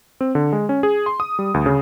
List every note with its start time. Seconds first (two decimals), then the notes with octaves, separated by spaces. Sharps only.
0.21 C4
0.35 D3
0.53 G#3
0.69 C#4
0.83 G#4
1.06 C6
1.20 D#6
1.39 G3
1.54 D2
1.66 C#3